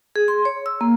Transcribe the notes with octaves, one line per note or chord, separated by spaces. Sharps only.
G#4
C6
C#5
E6
A#3